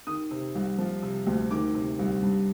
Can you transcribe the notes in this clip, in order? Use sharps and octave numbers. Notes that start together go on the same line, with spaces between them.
D#3 D#6
C3
C2
F3
C3
D2
D#3 D6
C3
C2
G2